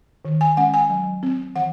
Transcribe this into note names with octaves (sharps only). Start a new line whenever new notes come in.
D#3
G#5
G#3 C#4 F#5
G#5
F#3
C4
E3 F#5